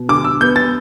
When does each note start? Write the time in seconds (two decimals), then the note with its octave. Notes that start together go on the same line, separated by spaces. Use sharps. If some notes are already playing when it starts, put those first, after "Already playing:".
Already playing: B2
0.09 D3 D6
0.24 E6
0.41 B3 G6
0.56 A6